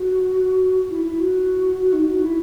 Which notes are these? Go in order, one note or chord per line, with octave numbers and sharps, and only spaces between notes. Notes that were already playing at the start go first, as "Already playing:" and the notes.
Already playing: F#4
E4
E4
F#4
F#4
D#4
F#4
E4